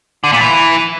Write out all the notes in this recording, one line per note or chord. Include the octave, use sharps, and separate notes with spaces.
D3
A#2
E3